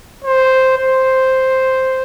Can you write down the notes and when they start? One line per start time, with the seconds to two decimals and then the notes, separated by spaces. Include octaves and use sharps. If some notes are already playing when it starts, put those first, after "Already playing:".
0.24 C5
0.78 C5